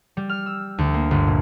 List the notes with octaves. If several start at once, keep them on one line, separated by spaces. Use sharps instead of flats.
G3
F6
E6
D2
A#3
G1
A#2